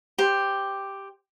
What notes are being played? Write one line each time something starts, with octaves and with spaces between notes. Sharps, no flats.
G4 C5